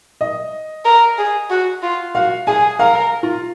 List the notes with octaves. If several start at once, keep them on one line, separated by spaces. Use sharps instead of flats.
D#5
A#4
G#4
F#4
F4
F#4 F5
G#4 G#5
A#4 F5
F4